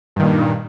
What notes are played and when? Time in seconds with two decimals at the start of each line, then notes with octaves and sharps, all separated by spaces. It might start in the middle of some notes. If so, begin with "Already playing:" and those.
0.16 G2
0.19 D#3
0.22 A#2